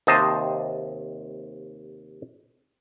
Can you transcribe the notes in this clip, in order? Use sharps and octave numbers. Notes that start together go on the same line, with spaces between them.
D#2 C3 C5 D#5 A5